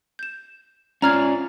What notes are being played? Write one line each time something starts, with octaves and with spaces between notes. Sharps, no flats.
G6 E7
C#4 F4 D5 A#5 F6 G#6